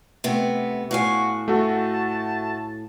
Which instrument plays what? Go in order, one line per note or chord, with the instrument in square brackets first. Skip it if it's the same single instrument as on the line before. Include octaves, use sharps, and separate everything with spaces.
[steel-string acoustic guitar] C3 A3 B3
[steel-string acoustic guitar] A2 F5 G#5 [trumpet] F#4
[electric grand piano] A3 F#4 [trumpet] A5